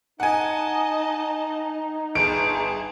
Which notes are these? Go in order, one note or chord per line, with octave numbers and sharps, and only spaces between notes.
D#4 D#5 F#5 G#5 A5
G1 G#4 A5 D7